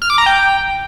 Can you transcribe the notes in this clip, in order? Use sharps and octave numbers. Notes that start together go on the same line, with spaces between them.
F6
D6
A#5
G5